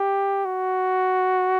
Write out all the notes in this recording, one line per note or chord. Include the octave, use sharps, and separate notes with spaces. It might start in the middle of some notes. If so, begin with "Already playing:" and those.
Already playing: G4
F#4